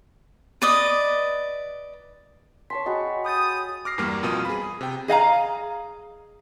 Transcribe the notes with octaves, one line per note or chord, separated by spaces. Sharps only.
B4 D5 D#5
C#5 A5 C6 B6
F#4 G#4 D#5 G5 B5
B5 D#6 G6 A6
D6 F6 A#6 C7
E2 G2 G3 A#3 D6 F6
F2 B2 F4 D#6 F6 D#7
G#4 B5
C3 G5
G#4 D#5 F5 A#5